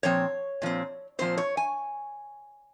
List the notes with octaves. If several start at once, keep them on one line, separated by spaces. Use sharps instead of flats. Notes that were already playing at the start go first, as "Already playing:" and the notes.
A#2 F3 C4 C#5
A#2 F3 C4
A#2 F3 C4 C5
C#5
G#5